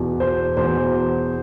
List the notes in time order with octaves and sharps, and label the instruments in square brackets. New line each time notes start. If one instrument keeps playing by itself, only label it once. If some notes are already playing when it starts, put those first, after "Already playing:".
Already playing: [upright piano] E2 B2
C5
E2 B2 C5